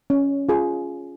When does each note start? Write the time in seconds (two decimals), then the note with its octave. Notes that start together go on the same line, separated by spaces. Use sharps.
0.10 C#4
0.49 F4 G#4